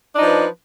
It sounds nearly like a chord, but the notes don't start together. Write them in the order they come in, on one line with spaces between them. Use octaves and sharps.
D4 D#4 F3 B4